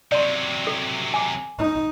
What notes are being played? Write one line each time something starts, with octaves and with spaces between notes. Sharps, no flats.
C3 F#3 D5 C6
A4
G#5 D6
D#4